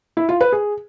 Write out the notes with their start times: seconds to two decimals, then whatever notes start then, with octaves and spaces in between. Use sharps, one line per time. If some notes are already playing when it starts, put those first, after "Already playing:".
0.17 E4
0.29 F4
0.41 B4
0.52 G#4